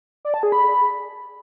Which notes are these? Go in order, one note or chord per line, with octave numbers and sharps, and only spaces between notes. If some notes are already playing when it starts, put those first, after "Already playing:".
D5
A5
G#4
B5